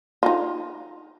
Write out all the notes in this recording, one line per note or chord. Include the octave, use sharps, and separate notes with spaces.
D#4 F4